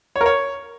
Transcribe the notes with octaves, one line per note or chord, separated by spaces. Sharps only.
C#5
A#4
C#5